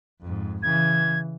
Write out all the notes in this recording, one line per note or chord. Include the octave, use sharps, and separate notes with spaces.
F2 G#2
C#3 E3 G#6